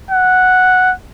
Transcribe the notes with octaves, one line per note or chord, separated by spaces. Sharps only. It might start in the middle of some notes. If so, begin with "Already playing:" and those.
F#5